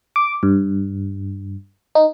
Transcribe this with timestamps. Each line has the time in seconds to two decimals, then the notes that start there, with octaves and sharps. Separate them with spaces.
0.16 D6
0.43 G2
1.95 D#4